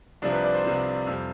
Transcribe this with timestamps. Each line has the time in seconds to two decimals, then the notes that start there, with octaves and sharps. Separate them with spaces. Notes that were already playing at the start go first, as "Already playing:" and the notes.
0.22 C2 C3 F3 D4
0.33 B4
0.43 D5
0.54 C5
0.64 C2 C3 F3 C5
1.07 F2 C3 G3